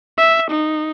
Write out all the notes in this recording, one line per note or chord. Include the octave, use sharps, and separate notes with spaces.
E5
D#4